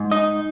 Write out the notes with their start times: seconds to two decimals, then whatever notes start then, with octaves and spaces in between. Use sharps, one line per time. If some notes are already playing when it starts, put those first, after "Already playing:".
Already playing: G#2
0.12 D#4 D#5